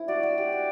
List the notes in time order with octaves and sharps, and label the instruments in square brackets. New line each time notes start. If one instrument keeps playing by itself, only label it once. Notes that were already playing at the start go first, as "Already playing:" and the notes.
Already playing: [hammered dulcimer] E4
[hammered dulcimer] F#4 [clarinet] D5
[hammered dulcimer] F#4
G4
F#4